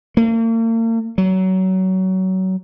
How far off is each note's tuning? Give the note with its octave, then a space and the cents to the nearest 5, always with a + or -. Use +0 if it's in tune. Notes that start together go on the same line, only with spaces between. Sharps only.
A#3 -40
F#3 +25